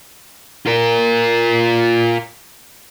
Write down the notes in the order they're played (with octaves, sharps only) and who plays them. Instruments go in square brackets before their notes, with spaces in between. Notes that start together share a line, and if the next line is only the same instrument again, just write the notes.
[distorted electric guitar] F4 A#4